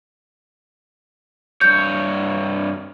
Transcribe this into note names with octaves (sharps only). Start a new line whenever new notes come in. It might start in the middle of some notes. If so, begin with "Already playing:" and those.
G2 C#5 G6